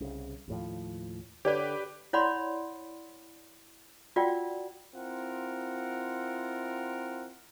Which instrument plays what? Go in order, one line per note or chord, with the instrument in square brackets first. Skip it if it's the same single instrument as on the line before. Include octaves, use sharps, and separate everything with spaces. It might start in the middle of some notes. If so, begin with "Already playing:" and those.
[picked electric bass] C2 C#3
D#2 A2 F3
[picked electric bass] D3 [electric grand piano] G4 B4 [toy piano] C#5 D5
[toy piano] E4 C#5 D5 F#5 B5 C6
F4 F#4 A#4 D5 F#5 G5
[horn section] C4 E4 F4 A#4 F#5